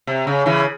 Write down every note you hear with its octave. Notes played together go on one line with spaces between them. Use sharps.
C3
C#3
C#3 E3